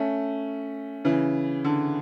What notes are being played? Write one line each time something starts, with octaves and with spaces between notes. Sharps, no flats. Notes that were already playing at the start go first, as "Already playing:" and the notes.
Already playing: A3 C#4
C#3 E3
D3